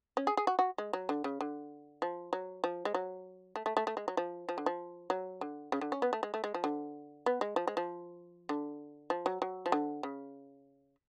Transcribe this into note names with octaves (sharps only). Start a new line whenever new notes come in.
C#4
G#4
G#4
F#4
F#4
G#3
F#3
D3
C#3
D3
F3
F#3
F3
G#3
F#3
A3
A3
A3
A3
G#3
F#3
F3
F3
D3
F3
F#3
D3
C#3
D3
C#4
B3
A3
G#3
A3
G#3
F3
D3
B3
G#3
F3
G#3
F3
D3
F3
F#3
F#3
F3
D3
C#3